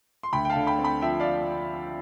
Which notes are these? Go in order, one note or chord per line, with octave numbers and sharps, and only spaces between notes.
C6
D2 G5 B5
G5
F5 A5
D3
G5 B5
C4
G5 B5
F3 E5 G5
D5 F5